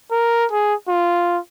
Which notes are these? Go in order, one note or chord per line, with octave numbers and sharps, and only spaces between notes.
A#4
G#4
F4